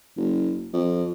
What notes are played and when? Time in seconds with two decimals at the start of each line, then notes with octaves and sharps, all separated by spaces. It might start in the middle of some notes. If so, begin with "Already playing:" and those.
0.17 F#1
0.74 F2